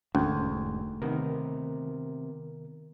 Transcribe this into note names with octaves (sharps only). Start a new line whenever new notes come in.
E1 D2 G#2 C#4
C3 D#3 B3 A#4